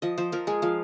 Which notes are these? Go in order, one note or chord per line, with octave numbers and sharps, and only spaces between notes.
F3 D#5
F3 C5
F3 A#4
G#3 G#4
F3 F5